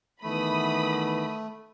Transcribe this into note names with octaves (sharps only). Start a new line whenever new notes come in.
D#3 E3 A3 B3 B5 D#6